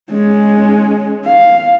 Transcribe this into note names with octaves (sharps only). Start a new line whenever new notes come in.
G#3 C#4
F5